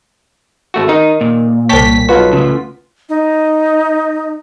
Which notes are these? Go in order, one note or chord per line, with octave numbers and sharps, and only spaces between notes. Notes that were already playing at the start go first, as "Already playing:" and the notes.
G#1 A3 F#4
D#3 D#4
A#2
C2 C#5 G5 A5 B6
B1 F4 F#4 B4 F#5
A2 C#3
D#4